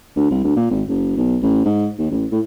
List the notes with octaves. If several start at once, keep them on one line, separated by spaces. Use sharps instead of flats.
D2
C2
D2
A#2
G#1
F#1
B1
A1
G#2
D#2
A1
A2